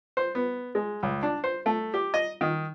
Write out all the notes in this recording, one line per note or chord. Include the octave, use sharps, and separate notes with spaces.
C5
B3
G#3
C#2
D4
C5
A3
G4
D#5
D#3